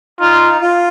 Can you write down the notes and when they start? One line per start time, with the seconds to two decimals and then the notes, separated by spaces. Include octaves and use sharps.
0.20 D#4 F4
0.61 F4